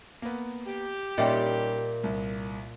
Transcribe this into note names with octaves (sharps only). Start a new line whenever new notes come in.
A#3 B3
G4
A#2 G3 C#4 D#4 D#5 E5 G5
C2